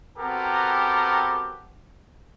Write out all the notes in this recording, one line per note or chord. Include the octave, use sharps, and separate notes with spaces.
B3 C4 F#4 G4 A4 A#4